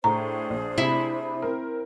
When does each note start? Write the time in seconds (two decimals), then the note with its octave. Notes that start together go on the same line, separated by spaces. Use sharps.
0.04 A2 D4 G#4 C5 A#5
0.50 A#1
0.78 C3 E4
1.42 C4 A#4